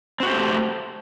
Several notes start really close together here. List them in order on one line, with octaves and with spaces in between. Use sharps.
C4 F#4 G4 C5 A3